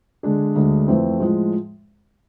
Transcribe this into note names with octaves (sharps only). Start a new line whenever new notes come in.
D3 G#3 D4 G#4
D2 D3 G#3
F2 E3 A3 C4
A2 F3 G#3